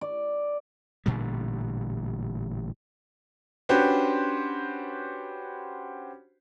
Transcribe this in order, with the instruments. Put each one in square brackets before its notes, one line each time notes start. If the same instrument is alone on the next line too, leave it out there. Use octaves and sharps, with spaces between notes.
[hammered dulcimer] D5
[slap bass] A1 A#2 D3 G3
[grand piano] C#4 D4 F#4 G4 B4 C5